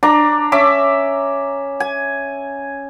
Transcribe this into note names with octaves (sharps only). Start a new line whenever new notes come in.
D4 A#5 D6
C#4 E5 D6
G#5